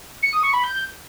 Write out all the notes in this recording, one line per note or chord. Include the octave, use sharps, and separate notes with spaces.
C#7
D#6
C#6
B5
G6